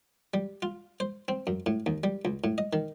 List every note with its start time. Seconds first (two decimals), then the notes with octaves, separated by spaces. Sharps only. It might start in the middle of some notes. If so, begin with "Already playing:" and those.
0.34 G3
0.62 F4
1.00 C5
1.28 C4
1.47 F#2
1.66 A2
1.86 D#2
2.04 G3
2.25 C#2
2.44 A2
2.58 D#5
2.73 D#3